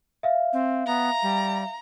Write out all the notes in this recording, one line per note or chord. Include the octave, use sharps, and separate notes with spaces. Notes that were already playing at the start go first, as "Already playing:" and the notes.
E5 F5
C4
B3 A#5
G3